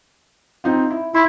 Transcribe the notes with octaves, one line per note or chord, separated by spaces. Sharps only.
C4 D#4 F4
E4
E4 C6